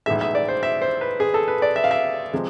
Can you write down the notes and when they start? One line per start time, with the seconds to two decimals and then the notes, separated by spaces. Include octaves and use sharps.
0.06 B1 A2 E3 G#3 E5
0.21 E5
0.35 D5
0.48 C5
0.63 E5
0.82 C5
1.01 B4
1.20 G#4
1.34 A4
1.48 B4
1.62 D5
1.76 E5
1.84 F5
1.91 E5
2.33 C3 F3 G#3